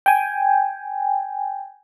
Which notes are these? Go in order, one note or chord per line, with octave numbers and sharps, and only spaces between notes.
G5 G#5